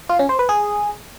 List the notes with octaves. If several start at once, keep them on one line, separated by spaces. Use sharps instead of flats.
F4
C#4
C5
B4
G#4